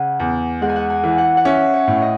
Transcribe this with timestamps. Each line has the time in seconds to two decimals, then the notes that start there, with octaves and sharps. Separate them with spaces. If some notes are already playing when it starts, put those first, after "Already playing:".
Already playing: C#3 F#5 G#5
0.20 E2
0.62 G#3 F#5
0.69 G#5
0.76 F#5
0.90 G#5
1.04 E3
1.18 F#5
1.37 F#5
1.45 C#4 E5
1.74 C#5
1.88 A2
2.02 D#5